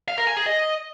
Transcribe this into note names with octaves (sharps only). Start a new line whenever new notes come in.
F5
A#4
G#5
G#4
D#5